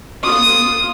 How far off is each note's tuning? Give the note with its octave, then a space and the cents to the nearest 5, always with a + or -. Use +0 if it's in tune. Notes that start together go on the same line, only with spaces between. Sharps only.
F4 +0 D#6 +0